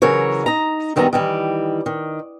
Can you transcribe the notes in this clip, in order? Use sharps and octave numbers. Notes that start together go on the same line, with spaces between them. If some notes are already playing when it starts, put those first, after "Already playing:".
C#3 E3 F#3 A#4 C#5
D#4 A#5
F#2 D#3 G3 B3 A#5
D#3 E3 G3
D#3